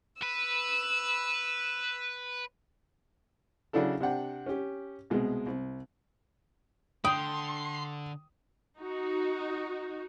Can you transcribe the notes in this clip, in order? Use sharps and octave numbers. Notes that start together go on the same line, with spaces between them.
B4 E6
C#3 F#3 D4 E4 A4
C3 D4 F#5 G5
C#4 G4
C2 B2 G#3
C2
D3 G5 B5 C6 D#6
D#4 F#4